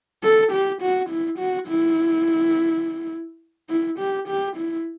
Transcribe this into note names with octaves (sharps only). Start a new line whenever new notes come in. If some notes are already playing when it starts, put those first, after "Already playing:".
A4
G4
F#4
E4
F#4
E4
E4
G4
G4
E4